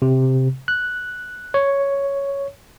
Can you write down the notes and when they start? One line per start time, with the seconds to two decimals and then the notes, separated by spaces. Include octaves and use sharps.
0.02 C3
0.68 F#6
1.54 C#5